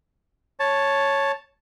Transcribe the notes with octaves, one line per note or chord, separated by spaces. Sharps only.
C#5 A5